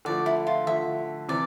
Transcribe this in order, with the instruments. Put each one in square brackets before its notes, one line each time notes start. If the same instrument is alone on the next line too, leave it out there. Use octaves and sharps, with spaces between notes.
[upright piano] D3 F3 A3 [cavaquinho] D5
[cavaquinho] E4
F4
[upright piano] D3 F3 A3 [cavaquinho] E5
[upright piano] C3 E3 [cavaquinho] D5